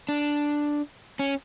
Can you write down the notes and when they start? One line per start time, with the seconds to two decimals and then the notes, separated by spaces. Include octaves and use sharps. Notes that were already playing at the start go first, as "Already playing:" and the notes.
0.09 D4
1.19 C#4